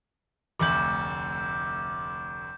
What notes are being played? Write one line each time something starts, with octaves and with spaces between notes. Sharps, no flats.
F1 D2 D6 G6 F#7